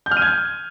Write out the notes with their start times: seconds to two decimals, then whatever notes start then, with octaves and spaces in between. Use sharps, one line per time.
0.06 G6
0.11 F6
0.17 D#7
0.22 G#6